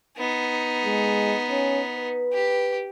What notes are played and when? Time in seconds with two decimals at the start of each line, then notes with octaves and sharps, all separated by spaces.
0.18 B3 D#4
0.85 G#3
1.49 C#4
1.97 B4
2.33 G4